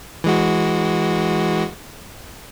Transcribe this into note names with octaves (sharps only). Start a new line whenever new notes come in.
E3 G#3 F#4